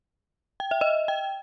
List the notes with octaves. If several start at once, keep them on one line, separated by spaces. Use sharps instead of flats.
G5
E5
D#5
G5